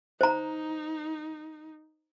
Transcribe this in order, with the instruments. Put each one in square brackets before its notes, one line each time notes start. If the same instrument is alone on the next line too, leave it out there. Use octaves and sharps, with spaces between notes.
[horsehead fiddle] D#4 [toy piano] C5 A#5